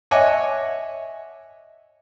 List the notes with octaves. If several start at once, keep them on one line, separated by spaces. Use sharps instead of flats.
C#5 D#5 E5 F#5 G#5 D6